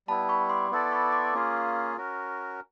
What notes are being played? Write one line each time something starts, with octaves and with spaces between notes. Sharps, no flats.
G3 B3 E4 A5 B5
B5 C#6
C6 D6
B3 E4 A4 D5
B5 C#6
C6 D6
A#3 C#4 F4 G#4
C#4 F#4 A#4